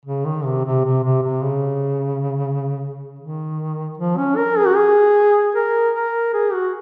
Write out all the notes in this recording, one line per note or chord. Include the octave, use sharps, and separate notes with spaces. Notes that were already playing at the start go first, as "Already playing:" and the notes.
C#3
D#3
C3
C3
C3
C3
C3
C#3
D#3
F3
C#4
A#4
G#4
F#4
G#4
A#4
A#4
G#4
F#4